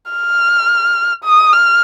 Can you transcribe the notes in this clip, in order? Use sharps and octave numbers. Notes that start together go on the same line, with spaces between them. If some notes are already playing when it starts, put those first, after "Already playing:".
F6
D#6
F6